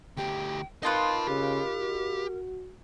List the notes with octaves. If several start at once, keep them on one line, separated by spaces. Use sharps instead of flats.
D2 G4 G5
D#4 F4 A#4 B4 D#5 A5
C#3 G4
F#4